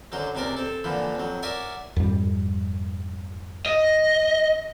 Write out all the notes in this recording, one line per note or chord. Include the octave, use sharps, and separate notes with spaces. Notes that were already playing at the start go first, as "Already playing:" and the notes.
F#2 D3 F#3 C5
C#2 C3 C4 A#4 D5
C4 A4
A#2 D3 E3 F3
F2 F#3
A#4 C#5 D5 E5 F#5 G#5
F2 G#2 G3
D#5